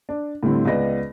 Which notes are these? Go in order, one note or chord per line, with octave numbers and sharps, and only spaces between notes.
D4
A2 D3 G3 C4 E4
C#2 B3 B4 D5 D#5 A#6